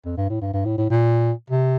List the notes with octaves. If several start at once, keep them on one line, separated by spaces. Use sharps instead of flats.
F2
G2
A2
G2
G2
A2
A2
A#2
C3